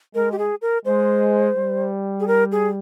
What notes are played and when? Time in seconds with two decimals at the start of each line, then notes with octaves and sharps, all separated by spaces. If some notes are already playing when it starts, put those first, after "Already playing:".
0.15 G#3 A#4
0.32 G4
0.39 G#4
0.62 A#4
0.85 G#3 C5
1.57 G3
2.20 G#4
2.28 A#4
2.52 G#4